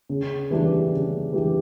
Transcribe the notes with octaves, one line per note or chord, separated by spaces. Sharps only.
C#3
E3 G3 D4 G4
C#3
E3 G3 D4 G4